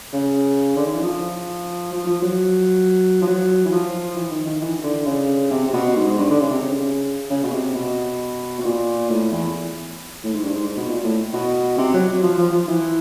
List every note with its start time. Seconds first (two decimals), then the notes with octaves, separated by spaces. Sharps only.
0.13 C#3
0.76 D3
0.86 D#3
0.94 E3
1.03 F3
1.93 F3
2.07 F3
2.22 F#3
3.22 F3
3.27 F#3
3.65 E3
3.72 F3
4.16 E3
4.31 D#3
4.47 D#3
4.61 E3
4.78 D#3
4.83 D3
5.06 C#3
5.51 C3
5.68 C3
5.73 B2
5.96 G#2
6.06 G#2
6.18 G2
6.30 D3
6.40 C#3
6.50 C3
6.61 C#3
7.30 C#3
7.43 B2
7.52 C3
7.75 B2
8.59 B2
8.64 A#2
9.10 A2
9.32 E2
10.24 A2
10.34 G#2
10.44 G2
10.54 G#2
10.77 B2
10.88 A#2
11.03 A2
11.33 B2
11.78 C3
11.94 F#3
12.08 F#3
12.23 F3
12.38 F3
12.52 F3
12.68 E3